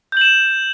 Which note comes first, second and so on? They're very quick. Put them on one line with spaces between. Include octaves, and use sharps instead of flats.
G6 F#7 E7